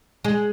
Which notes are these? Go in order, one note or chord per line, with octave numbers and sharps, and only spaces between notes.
G#3